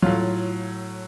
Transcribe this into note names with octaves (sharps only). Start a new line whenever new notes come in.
A2 F#3 F4